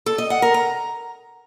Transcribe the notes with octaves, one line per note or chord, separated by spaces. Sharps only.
A4
D#5
F#5
A#4
A#5